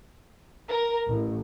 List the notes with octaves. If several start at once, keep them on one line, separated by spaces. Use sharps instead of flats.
A#4
A1